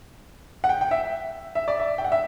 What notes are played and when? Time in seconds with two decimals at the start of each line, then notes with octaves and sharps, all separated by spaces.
0.64 F#5
0.69 G5
0.81 G5
0.91 E5
1.55 E5
1.68 D5
1.79 E5
1.98 G5
2.04 F#5
2.12 E5